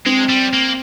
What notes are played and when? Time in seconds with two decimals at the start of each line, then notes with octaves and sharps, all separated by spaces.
0.06 G#3 C4
0.29 G3
0.53 A#3